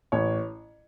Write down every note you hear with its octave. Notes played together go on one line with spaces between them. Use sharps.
A1 C#5